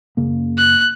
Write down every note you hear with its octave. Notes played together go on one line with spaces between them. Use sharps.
F#2 C#3 A#3
F#6